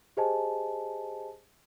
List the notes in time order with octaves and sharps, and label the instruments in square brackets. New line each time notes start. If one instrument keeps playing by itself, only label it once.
[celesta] G4 G#4 C5 D#5 G#5 A5